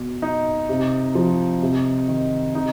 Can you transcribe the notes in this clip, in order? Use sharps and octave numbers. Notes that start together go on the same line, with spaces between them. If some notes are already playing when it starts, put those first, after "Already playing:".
Already playing: B2
D#4
C3
F3
C3
D#3
C3 D#4